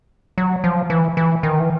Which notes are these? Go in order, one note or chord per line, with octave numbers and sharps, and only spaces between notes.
F#3
F3
E3
E3
D#3
E3